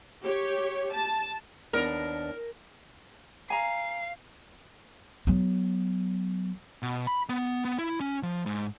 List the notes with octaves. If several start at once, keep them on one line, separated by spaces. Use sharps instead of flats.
G4 C#5
A5
D#2 B3 D4 A#4
F5 G#5 A#5 C7
F#3 B3
B2
B5
B3
B3
E4
C#4
F3
G#2